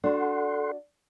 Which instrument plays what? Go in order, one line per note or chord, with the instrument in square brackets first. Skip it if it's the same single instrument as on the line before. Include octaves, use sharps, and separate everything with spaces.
[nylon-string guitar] D4 F#4 [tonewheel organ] A4 F#5 C6